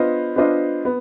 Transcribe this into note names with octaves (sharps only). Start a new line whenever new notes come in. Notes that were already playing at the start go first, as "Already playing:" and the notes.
Already playing: B3 D4 F4 C5 D#5
B3 D4 F4 C5 D#5
B3